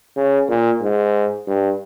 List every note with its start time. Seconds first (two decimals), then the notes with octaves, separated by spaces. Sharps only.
0.16 C#3
0.48 A#2
0.82 G#2
1.47 G2